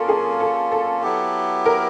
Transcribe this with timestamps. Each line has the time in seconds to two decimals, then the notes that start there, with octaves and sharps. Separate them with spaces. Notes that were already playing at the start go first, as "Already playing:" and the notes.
Already playing: A#3 C#4 F4 A4 A#4
0.08 G#4
0.40 A4
0.72 A4
1.02 F#3 B3 E4 G4
1.66 A#4